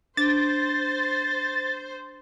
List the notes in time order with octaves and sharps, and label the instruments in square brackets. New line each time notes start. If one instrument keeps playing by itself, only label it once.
[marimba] D4 [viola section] C5 [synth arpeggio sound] A6